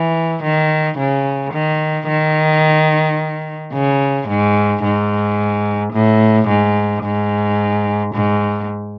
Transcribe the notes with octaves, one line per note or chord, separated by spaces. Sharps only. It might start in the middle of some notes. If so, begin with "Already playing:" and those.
Already playing: E3
D#3
C#3
D#3
D#3
C#3
G#2
G#2
A2
G#2
G#2
G#2